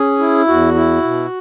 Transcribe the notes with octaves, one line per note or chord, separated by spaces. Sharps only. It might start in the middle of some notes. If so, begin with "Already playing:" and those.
Already playing: C#4 G#4
E4
E2 F#4
E4
B2